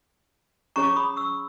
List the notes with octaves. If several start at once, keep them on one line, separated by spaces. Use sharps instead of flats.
C#4 G#4 C#5 A#5 C#6
B5 D#6
C#6 E6